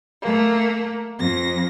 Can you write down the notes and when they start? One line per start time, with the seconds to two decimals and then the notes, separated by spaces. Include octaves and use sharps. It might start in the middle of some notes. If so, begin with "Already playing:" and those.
0.21 A3 A#3
1.19 F2 A#6